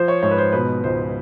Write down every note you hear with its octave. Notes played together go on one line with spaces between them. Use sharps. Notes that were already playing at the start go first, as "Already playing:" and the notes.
Already playing: F3 C5
C#5
G#2 C#5
B4
C5
B2 B4
C#2 C5